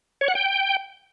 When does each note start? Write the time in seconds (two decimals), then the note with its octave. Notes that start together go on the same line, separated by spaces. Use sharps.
0.21 C#5
0.28 F#5
0.35 G5